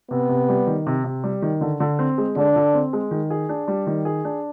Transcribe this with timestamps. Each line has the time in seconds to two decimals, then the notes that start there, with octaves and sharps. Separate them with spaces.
0.11 C3 B3
0.29 C3
0.49 G3
0.67 D#3
0.86 C3
1.04 C3
1.24 G3
1.42 D#3
1.61 D3
1.80 D3
1.99 C4
2.18 G#3
2.36 D3 D4
2.56 D3
2.74 C4
2.93 G#3
3.11 D#3
3.30 G#4
3.49 D4
3.68 G3
3.87 D#3
4.05 G#4
4.25 D4